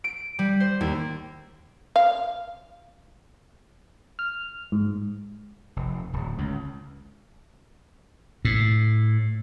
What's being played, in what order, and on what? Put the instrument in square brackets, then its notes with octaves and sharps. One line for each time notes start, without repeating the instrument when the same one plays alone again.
[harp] D7
G3
C5
D#2
[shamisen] F5
[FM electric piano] F6
G#2
[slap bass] F1
D1
C#2
A2